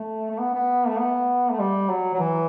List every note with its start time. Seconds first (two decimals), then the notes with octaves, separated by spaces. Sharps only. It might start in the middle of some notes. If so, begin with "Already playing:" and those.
Already playing: A3
0.30 A3
0.39 B3
0.54 B3
0.88 A3
0.99 B3
1.51 A3
1.59 G3
1.89 F#3
2.14 F#3
2.19 E3